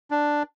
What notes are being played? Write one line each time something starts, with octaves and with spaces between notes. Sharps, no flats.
D4